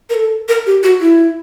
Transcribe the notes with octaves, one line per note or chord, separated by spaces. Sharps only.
A#4
A4
A#4
G4
F#4
E4